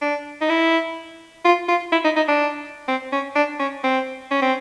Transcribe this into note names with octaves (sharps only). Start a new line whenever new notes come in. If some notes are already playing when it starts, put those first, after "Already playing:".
D4
D#4
E4
F4
F4
E4
D#4
D#4
D4
C4
C#4
D4
C#4
C4
C#4
C4